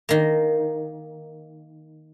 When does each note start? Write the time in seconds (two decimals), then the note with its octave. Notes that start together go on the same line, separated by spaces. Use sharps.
0.09 D#3 A#3